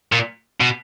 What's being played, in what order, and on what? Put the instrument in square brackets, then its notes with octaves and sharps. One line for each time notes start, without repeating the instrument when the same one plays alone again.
[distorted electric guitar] A#2
B2